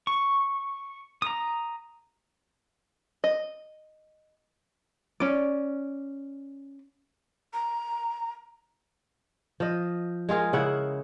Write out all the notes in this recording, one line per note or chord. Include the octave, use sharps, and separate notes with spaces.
C#6
A#5 D#6
D#5
C#4 D5
A#5
F3 D#5
G#3 F4 G#4 A#4
C#3 E4 F#5